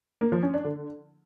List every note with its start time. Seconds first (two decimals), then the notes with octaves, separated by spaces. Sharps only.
0.21 A#3
0.32 F3
0.43 C#4
0.54 D4
0.64 D3